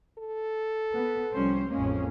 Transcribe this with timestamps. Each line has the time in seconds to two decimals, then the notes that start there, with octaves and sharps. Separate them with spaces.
0.18 A4
0.93 B3
1.32 C2 F3 G3 C#4 C5
1.70 A1 F2 G#3 A#3 C#4